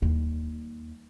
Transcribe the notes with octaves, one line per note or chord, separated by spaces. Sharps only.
D#2 G3